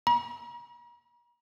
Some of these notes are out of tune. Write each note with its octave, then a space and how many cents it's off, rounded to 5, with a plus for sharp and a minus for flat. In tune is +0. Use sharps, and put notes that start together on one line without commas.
A#5 +45